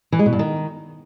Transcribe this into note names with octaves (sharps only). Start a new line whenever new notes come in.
E3
G#3
B2
G2
D#3